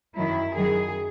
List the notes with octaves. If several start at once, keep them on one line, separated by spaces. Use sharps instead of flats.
F#2 D#3 F#3 E4
F#2 D#3 F#3 G#4